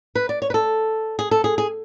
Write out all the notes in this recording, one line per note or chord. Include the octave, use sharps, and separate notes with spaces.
B4
D5
C#5
B4
A4
G#4
A4
G#4
G#4